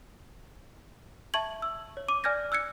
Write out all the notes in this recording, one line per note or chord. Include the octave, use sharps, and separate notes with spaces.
E5 A5 C#6 G#6 F#7
E6
C#5
D6 D#7
D5 G#5 F6 G6 G#6 A#6
E6 F#6 G#6 C#7